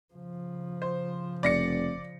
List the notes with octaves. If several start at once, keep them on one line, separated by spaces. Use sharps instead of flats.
C#3 F3
C5
F1 D5 A#6 C#7